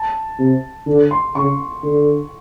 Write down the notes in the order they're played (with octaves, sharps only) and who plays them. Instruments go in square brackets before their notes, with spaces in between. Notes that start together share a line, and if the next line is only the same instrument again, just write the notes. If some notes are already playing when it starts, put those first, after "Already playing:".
Already playing: [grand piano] A5
[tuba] C3
D3
[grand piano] C6
[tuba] C#3 [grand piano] C#6
[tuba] D3